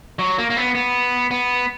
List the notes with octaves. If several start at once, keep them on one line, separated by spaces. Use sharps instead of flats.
F#3
A#3
A#3
B3
B3
B3